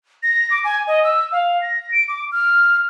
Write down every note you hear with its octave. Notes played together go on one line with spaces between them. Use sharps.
A#6
D6
G#5
D#5
E6
F5
A#6
D7
D6
F6